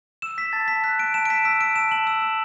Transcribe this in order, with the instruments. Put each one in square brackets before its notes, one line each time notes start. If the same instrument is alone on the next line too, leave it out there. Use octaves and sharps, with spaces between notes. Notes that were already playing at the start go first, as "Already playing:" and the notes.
[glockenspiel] E6 E7
E6 B6
A5 A6
A5 B6
F#6 B6
F#6 D7
A5 E7
D7
A5 B6
E6 B6
E6 D7
A5 E7
A5 F#7
E6 E7
E6